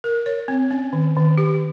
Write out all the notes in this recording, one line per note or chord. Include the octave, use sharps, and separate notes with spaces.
A#4
C#5
C4
C#4
D#3
D#3
G4